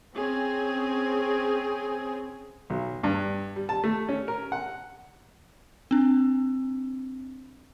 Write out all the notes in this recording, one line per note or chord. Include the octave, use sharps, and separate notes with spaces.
C4 C#4 G#4
B1
G2
G3
A5
A3
C#4
A#4
F#5
C4 D4